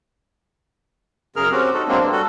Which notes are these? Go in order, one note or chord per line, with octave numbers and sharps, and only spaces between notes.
F#2 C#3 G#4 A#4 F6
C4 C#4 F#4 G4
D#4 F#4 A4
F#3 G#3 A#3 C4 D4
G2 D4
G3 F#4 A4